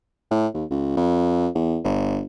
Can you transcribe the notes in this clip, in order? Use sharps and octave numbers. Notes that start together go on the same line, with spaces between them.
A2
D#2
C#2
F2
E2
G1